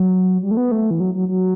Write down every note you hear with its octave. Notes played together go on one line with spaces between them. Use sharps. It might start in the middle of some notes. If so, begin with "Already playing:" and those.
Already playing: F#3
G3
A3
B3
A3
E3
F#3
F#3
F#3